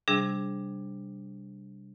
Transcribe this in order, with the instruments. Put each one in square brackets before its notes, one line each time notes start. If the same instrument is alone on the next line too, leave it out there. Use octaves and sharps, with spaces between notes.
[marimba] C3 G3 D4 G#4